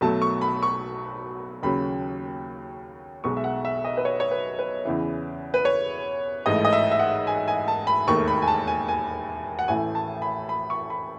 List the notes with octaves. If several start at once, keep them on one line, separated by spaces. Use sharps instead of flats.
B1 B2 F#3 A3 A5
C#6
B5
C#6
D#2 C#3 F#3 B5
B1 B2 G#3 C#6
E5
F#5
E5
D#5
B4
C#5
C#5
B4
B4
E2 C#3 E3
B4
C#5
A1 G#2 E3 A3 D#5
D#5
E5
E5
F#5
G#5
G#5
A5
B5
E1 D#2 D#3 A3 C#6
B5
G#5
A5
G#5
G#5
F#5
A1 A2 E3 A3 G#5
A5
B5
B5
C#6
B5